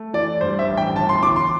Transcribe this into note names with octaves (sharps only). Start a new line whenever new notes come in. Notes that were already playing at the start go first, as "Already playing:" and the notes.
Already playing: A3
E3 D5
G2 C5
E5
A1
G5
G1 A5
C6
E3 D6
C6